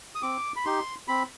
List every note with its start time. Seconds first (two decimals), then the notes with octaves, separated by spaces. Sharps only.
0.15 D#6
0.22 C4 D6
0.56 B5
0.65 D#4 G4 C6
1.08 C4 B5